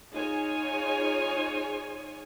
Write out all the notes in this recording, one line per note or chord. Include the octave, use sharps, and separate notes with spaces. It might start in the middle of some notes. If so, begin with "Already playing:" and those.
D#4 F4 G#4 C#5 G#5